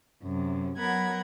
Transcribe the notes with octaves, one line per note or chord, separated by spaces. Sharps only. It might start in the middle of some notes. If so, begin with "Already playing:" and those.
F#2 C3
F#3 B3 A#4 F#5 B5 G#6